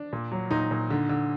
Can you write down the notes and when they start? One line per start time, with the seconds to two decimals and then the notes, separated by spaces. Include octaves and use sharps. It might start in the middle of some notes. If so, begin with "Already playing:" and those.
Already playing: D4
0.13 A#2
0.32 F#3
0.51 A#2 D#4
0.71 A#2
0.90 D3
1.09 D3